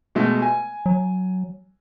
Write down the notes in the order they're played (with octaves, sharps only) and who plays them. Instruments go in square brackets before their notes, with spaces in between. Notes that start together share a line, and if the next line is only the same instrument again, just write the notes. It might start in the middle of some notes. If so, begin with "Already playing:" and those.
[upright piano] B2 G#3 A3
G#5
[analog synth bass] F#3